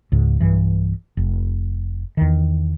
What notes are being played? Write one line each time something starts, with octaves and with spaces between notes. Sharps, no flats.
C#2 G#2
B1 G2 E3
F1
E2 D#3